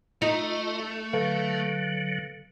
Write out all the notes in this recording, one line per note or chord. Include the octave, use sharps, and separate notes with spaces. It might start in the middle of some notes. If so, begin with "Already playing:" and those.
A3 D#4 F4 D#5
D3 F#3 A4 B4 F5